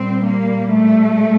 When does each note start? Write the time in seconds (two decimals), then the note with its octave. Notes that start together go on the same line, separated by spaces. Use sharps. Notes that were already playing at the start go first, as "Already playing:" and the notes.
Already playing: A#2 G3 C4
0.25 A#3
0.73 A3